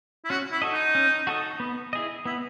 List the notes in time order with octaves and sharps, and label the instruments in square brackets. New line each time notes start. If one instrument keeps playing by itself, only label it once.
[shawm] E4
[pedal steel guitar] C#4 [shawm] F#4
[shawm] E4
[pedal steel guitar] F#4 A4 D#5
[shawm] D#4
[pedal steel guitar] C#4
F#4 A4 D#5
B3
E4 G#4 D#5
[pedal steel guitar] B3 [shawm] E4